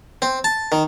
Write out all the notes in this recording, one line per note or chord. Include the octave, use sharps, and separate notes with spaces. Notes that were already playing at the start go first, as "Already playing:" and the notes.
C4
A5
D#3